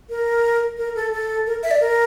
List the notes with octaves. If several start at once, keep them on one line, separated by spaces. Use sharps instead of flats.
A#4
A#4
A4
A4
A#4
E5
D5
A#4